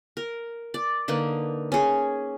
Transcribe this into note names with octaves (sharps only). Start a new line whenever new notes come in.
A#4
D5
D3 A#3 D#4 B4
C#4 G#4